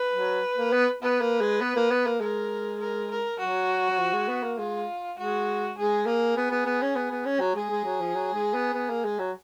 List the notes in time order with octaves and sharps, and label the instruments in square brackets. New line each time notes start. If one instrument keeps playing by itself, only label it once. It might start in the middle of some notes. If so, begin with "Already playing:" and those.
Already playing: [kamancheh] B4
[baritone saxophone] F#3
A#3
B3
[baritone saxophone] B3 [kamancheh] B4
[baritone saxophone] A#3
G#3
B3
A#3
B3
A#3
[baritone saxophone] G#3 [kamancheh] A#4
[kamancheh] A#4
A#4
[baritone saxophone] F#3 [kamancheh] F#4
[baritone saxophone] F#3
F3
G#3
B3
A#3
[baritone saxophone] G#3 [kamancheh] F4
[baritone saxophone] G#3 [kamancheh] F#4
[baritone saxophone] G#3 [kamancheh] G#4
[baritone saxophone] A#3 [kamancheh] G#4
[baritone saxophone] B3
B3
B3
C#4
B3
B3
C#4
F#3
[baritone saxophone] G#3 [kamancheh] G#4
[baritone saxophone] G#3
F#3
F3
F#3
G#3
B3
B3
A#3
G#3
F#3